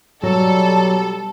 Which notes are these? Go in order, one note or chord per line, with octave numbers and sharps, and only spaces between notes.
B2 F#3 G3 A4